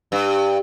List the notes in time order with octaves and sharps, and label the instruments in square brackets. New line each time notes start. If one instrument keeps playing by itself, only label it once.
[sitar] G2